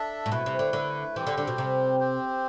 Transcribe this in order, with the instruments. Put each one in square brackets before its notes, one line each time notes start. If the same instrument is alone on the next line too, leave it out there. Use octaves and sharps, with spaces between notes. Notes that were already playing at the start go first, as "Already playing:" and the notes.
Already playing: [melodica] D4 A4 E5
[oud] A2
[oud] B2 [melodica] A3 E4 B4
[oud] C3
D3
D3
[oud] E3 [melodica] G3 C4 G4 C5
[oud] D3
D3
B2
C3
[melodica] C4 G4 C5